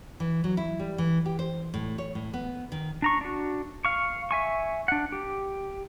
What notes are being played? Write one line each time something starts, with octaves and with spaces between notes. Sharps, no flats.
E3
F#3
E4
G3
E3
G4
C5
A2
C#5
A2
B3
D#3
D4 A#5 C#6
D4 F#4
F5 C#6
E5 G#5 C#6
D4 F#5
G4